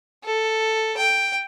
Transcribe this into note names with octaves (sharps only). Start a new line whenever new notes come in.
A4
G5